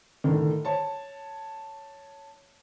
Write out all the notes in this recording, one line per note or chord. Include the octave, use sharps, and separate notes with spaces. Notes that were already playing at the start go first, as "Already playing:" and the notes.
A2 D3 D#3
C#5 A5